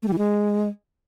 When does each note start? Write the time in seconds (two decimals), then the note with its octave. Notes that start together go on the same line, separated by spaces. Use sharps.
0.03 A3
0.08 G3
0.13 E3
0.18 G#3